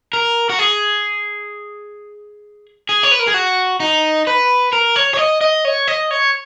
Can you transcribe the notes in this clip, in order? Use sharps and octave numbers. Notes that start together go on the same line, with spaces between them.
A#4
F#4
G#4
G#4
C#5
B4
A#4
G#4
F#4
D#4
B4
A#4
C#5
C#5
D#5
D#5
C#5
D#5
C#5